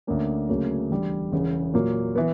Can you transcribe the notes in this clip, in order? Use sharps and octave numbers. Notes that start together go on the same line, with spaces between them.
D2 D3 A#3 C#4
D2 C#3 F#3 A#3
E1 E2 D3 G3
E1 E2 C#3 E3
A#2 F#3 A#3
E3 B3